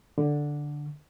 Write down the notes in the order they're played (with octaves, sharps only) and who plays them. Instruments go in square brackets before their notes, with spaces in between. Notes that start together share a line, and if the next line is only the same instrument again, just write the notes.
[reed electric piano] D3